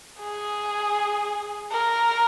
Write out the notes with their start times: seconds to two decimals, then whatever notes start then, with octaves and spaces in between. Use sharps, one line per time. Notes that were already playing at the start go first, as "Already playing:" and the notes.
0.20 G#4
1.72 A#4